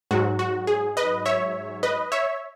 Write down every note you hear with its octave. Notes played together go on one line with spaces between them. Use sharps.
G#2 F#3 F#4
F#4
G#4
B4 D#5
C#5 E5
B4 D#5
C#5 E5